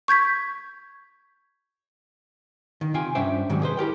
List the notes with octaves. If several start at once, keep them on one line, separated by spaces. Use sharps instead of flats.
C#6 G6 G#6 B6
D#3
C3 F4 G5 G#5
G2 C#4 D4 C5 E5 G5
G#2 C3 D#3 F#3 G3
G#4 B4 C5
E4 G4 A#4 G5